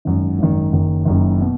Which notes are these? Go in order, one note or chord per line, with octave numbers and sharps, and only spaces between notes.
G#1 F#2 D#3
G#1 F#2 D#3
F#1 F#2 D#3
F#1 F#2 D#3
B2